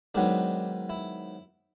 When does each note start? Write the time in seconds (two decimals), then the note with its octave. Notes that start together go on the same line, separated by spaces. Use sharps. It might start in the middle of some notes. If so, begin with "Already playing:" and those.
0.15 G#2 D#3 F#3 B3 D4
0.90 E4